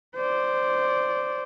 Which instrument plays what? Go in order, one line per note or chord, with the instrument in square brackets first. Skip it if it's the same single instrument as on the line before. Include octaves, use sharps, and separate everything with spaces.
[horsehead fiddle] C5 D5